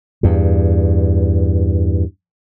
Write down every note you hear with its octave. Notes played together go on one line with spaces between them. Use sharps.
E2 G2